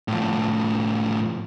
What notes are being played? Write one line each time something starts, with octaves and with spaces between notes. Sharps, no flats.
A2 F3